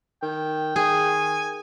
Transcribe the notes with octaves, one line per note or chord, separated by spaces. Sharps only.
D#3 G5
D#3 G#4 G#5